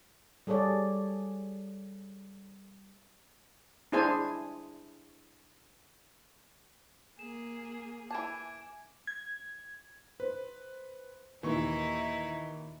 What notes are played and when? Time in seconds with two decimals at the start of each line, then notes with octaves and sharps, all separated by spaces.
0.47 G3 G#4 A4 C#5 D5
3.92 D4 E4 G#4 C5 G#5 A5
7.19 A#3 G#4 E7
8.11 E3 G#5 A5 D6 G#6 D7
9.07 G#6
10.20 B4 C5
11.43 D#2 A#2 E3 D#4 E4 C#6